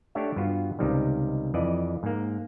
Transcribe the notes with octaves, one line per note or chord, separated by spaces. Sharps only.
A3 D4 G4 C#5 E5
G2 B3 F4 F#4
C#2 C3 D#3 G3
F2 E3 D5 D#5
G#2 A#3